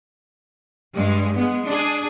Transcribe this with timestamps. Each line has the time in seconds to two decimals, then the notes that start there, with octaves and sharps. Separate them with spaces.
0.94 G2 G#3
1.35 G#3 B3
1.66 D4 G#4